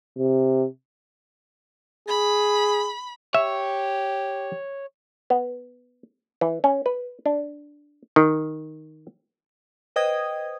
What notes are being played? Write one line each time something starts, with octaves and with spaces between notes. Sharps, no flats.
C3
G#4 B5
G4 C#5 E5
B3
E3
C#4
B4
D4
D#3
B4 C5 D#5 G5 D#6 G#6